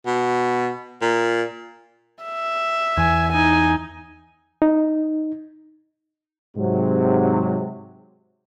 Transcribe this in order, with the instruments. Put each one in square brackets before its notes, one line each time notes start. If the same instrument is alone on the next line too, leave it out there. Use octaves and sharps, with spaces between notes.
[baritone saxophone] B2
A#2
[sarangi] E5
[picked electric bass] E2 [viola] G#5
[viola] D#4 [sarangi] G#5
[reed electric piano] D#4
[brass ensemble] G#2 C3 F#3